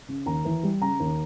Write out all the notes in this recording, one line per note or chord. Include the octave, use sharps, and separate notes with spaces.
C#3
D#2 A#5
E3
G3
C#3 A#5
D#2